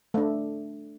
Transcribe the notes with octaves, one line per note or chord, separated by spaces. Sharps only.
A3 D4